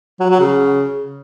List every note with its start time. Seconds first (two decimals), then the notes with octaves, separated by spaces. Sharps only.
0.20 F#3
0.30 F#3
0.40 C#3